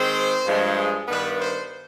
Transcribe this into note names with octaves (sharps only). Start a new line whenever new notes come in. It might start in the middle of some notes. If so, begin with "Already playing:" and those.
Already playing: D#3 G#3 C4 C5
G2 F3 G#3
G#4
G2 D#3 B3 D4 B4
C5